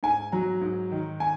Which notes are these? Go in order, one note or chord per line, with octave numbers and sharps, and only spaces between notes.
G#2 G#5
F#3 A#5
G#2
D#3
G#5